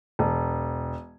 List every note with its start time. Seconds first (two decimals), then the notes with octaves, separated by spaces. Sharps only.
0.19 E1